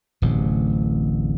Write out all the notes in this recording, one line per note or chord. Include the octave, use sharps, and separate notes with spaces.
D1 A1 C3